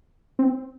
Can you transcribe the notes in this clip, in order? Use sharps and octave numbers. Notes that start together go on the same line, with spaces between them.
C4